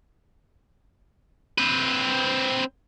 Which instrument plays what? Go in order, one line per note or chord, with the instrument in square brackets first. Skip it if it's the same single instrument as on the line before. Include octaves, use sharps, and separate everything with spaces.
[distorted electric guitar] C4 B4